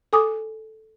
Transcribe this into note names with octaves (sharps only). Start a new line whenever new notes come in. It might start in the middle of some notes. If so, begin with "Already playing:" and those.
A4 G#5 D6 D#6